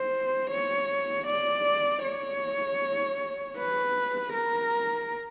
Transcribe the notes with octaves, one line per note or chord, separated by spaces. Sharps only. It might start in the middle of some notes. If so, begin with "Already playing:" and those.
Already playing: C5
C#5
D5
C#5
B4
A#4